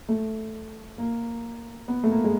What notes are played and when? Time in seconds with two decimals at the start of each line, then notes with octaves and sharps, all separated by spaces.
0.09 A3
0.98 A#3
1.88 B3
2.04 A3
2.11 A#3
2.24 G#3